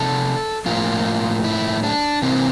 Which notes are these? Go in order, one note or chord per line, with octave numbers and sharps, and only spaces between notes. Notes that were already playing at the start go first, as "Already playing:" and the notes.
Already playing: C3 F3 A#3 A4
A2 F3 A#3 F4
E4
D4
C3 E3 A#3 C4